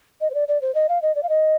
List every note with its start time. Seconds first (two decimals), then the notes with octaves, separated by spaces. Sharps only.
0.21 D#5
0.30 C5
0.34 D5
0.48 D5
0.61 C5
0.75 D#5
0.89 F5
1.02 D#5
1.15 D5
1.23 F5
1.29 D#5